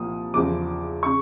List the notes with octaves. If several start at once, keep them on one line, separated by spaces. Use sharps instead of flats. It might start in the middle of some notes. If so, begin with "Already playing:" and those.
Already playing: C2 A#2 F3 D#6
E2 C#3 F3 D6
C#3 C#6